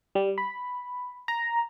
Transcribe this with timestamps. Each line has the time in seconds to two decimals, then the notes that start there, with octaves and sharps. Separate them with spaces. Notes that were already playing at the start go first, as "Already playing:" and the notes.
0.15 G3
0.38 B5
1.28 A#5